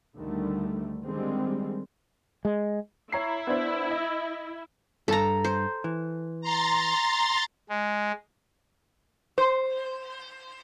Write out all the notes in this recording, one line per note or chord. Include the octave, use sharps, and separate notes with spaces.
D2 D3 D#3 G3 A3
D3 D#3 G3 G#3 C4
G#3
E4 C#5 A#5 C7
B3 D4 C5
D#5
G2 A4 A5 A#5
C5
E3
A#5 C6 A6
G#3
C5